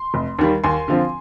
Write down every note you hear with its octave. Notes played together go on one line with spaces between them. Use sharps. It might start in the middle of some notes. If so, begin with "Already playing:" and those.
Already playing: C6
F1
D#2 D#3 G3
D#2 G#5 C6
D3 F3 C4 F4